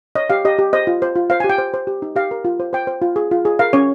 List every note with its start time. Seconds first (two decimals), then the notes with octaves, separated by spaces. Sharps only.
0.15 C#5 D#5
0.30 G4 F5
0.45 G4 D#5
0.59 G4
0.73 C5 D#5
0.87 F4
1.02 C5
1.15 F4
1.30 C5 F5
1.40 G#5
1.44 G4
1.50 G5
1.58 C5
1.74 C5
1.87 G4
2.02 D#4
2.16 G4 F5
2.31 A#4
2.45 F4
2.60 C5
2.73 C5 G5
2.87 C5
3.02 F4
3.16 G#4
3.31 F4
3.45 G#4
3.59 A#4 F5
3.73 C#4 C#5